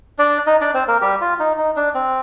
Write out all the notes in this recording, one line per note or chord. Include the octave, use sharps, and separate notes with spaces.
D4 D5
D#4 D#5
D4 D5
C4 C5
A#3 A#4
G3 G4
F4
D#4
D#4
D4
C4